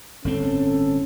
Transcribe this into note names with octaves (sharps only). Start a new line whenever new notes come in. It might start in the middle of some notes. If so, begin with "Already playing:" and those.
G1 A2 C4 C#4 A4